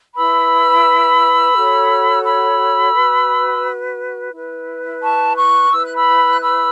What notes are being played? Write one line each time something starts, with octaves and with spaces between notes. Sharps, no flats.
E4 B4 B5 E6
F#4 A4 C#5
B5 E6
F#4 B4
E4 B4
A5 C#6
C#6 F#6
E4 B4 E6
F#6
B5 E6
F#6
B5 E6